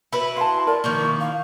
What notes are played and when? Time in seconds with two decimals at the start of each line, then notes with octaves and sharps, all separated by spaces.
0.12 E4 F#4 B4 B5
0.37 F5 A5 C6
0.67 A#4 D5
0.84 D#3 F3 A#3 C#6
1.00 E4
1.20 F5